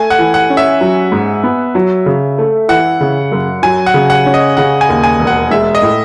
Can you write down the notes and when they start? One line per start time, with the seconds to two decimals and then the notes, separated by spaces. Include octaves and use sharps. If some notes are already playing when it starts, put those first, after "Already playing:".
Already playing: A3 G#5
0.10 F#5
0.18 E3
0.34 F#5
0.50 C#4
0.57 E5
0.81 F#3
1.12 G#2
1.43 B3
1.75 F#3
2.06 C#3
2.38 A3
2.68 E3 F#5
3.01 C#3
3.32 F#2
3.62 F#3 G#5
3.86 F#5
3.94 C#3
4.10 F#5
4.26 C#4
4.34 D#5
4.57 C#3 F#5
4.81 G#5
4.89 D#2
5.04 G#5
5.19 E1
5.27 F#5
5.51 G#3 E5
5.75 D#5
5.82 A2